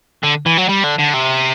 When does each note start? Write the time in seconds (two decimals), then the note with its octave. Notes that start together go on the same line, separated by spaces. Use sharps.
0.23 D3
0.46 E3
0.57 F#3
0.69 G3
0.83 D3
0.98 D3
1.13 C3